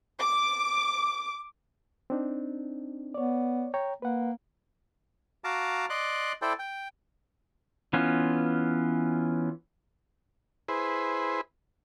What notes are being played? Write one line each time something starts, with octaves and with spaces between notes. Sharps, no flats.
D6
C4 D4 D#4
B3 C#5 D5
C#5 G5 A#5
A#3 B4 F#5
F#4 F5 A5 A#5 D6
D5 D#5 C6 D6 F#6
E4 A4 C5 D5 G5
G5
E3 B3 C#4 F4
E4 G#4 B4 C5